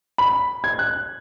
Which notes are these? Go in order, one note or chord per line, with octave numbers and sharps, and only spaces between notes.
B5
G#6
F#6